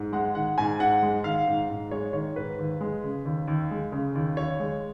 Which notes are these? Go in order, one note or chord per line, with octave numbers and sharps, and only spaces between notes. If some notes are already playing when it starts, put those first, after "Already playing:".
Already playing: G#2
G#3 F#5
D#3 F#5
G#2 G#5
G#2 F#5
G#3
D#3 F5
G#2
G#2
G#3 C#5
D#3 C#5
G#2 B4
D#2
G#3
C#3
D#2
D#2
G#3
C#3
D#2
D#2 C#5
G#3